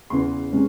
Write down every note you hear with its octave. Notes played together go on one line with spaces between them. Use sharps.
E2 C#3 E3 C6
C3 G#3 C#4